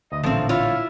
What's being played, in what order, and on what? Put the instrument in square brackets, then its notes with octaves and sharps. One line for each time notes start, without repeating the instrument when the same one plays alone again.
[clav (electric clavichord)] D2 [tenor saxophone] D#5
[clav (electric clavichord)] A1 A#2 D3 [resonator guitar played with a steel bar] F3 C4 [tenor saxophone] A3
[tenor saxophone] E4 [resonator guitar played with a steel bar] F4 C#5